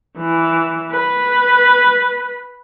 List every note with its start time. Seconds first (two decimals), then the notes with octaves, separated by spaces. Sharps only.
0.17 E3
0.91 B4